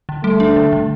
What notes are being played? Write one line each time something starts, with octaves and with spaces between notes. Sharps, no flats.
D3
G3 A3
D4
D3
D3